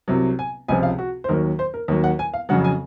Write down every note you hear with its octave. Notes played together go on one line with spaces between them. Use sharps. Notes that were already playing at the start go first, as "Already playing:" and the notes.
C2 C3 F#3
G#5
C#2 C3 F3 G#5
F5
F#4
C5
D#2 D#3 F#3 A#4
C5
A#4
D#2 D#3 F#3
F#5
G#5
F5
F2 C#3 F#3 F#5
G#5